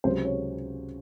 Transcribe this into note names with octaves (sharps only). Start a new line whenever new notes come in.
C#2 C3 F#3 C5
C#5